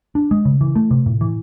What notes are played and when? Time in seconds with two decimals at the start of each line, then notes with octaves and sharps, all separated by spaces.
0.15 D4
0.31 G#3
0.45 C#3
0.61 E3
0.76 A3
0.91 C3
1.06 A2
1.21 E3